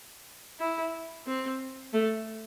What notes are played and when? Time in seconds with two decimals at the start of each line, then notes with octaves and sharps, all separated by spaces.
0.59 E4
1.27 C4
1.93 A3